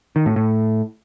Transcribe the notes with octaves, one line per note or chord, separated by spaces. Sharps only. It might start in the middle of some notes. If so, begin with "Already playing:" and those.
D#3
A2
A2